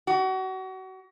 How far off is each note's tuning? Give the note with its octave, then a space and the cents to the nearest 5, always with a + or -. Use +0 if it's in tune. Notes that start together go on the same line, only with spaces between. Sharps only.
F#4 +30